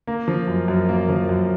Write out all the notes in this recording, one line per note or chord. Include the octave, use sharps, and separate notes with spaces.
A#3
F3
F#2
F#2
A#3
F3
F#2